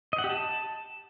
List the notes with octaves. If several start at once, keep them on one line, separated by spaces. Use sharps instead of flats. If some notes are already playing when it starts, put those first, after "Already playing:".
D#5
F#5
G4
A5